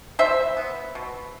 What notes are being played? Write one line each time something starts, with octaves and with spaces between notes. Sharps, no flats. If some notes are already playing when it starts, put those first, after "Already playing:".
B2 C5 E5
B3
B2